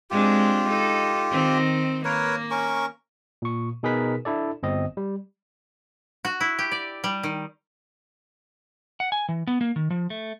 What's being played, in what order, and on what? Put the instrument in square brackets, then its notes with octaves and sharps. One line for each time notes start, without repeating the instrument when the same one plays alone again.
[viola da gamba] G#3 C4 D4 [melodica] F4 G4
[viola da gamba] D#4 A4
D#3 C4
[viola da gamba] A#3 [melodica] A#4 B4 C#5
[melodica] C#4 A#4 C#6
[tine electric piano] A#2 C#6
B2 D#4 G#4 A#4 B4 B6
D4 E4 A4 D5
G1 C4 D#5
G3
[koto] F#4
E4
G4
D5
G3
D#3
[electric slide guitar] F#5
G#5
E3
B3
A#3
D#3
F3
A3